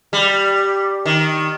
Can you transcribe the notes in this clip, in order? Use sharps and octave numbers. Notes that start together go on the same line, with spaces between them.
G3
D#3